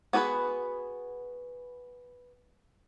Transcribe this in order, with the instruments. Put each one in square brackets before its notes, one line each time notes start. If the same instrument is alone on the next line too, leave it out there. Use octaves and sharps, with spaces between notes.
[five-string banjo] B3 F#4 G#4 A#4 B4